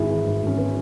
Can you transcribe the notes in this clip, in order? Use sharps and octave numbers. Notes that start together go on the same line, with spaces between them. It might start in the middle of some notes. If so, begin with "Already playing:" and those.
Already playing: G#1 E4 G#4
E3
G#2
G#1 C#4
B3